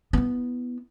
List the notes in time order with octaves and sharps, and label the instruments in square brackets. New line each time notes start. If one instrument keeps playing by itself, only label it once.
[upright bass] B3 E4